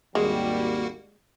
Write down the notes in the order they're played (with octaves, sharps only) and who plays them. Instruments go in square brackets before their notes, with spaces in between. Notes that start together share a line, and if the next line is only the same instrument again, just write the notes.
[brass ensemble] G#1 D#2 G3 [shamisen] G#3 [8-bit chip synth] A#3 F#4